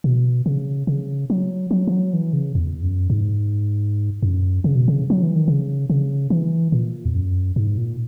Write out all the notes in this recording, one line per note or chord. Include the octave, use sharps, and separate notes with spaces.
B2
C#3
C#3
F#3
F#3
E3
F#3
E3
C#3
E2
F#2
G#2
F#2
C#3
B2
C#3
F#3
E3
D#3
C#3
C#3
E3
A#2
E2
F#2
G#2
A#2